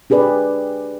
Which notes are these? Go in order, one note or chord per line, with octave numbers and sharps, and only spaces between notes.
D4 G4 G#4 B4 D5